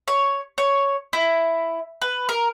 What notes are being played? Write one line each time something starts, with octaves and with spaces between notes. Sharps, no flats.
C#5
C#5
E4
B4
A#4